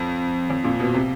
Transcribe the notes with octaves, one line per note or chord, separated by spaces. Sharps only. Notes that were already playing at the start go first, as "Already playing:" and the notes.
Already playing: F2
F2
A#2
B2
C3